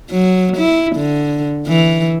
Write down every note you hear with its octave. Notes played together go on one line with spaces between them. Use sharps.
F#3
E4
D3
E3